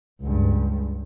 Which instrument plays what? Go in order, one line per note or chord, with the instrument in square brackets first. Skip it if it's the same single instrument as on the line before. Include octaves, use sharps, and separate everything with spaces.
[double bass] C#2 G2